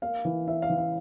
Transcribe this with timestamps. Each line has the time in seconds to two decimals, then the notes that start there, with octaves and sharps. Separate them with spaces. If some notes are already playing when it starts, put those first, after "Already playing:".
0.02 A#3 F5
0.25 E3
0.48 E4 E5
0.62 F5
0.70 E3
0.78 F5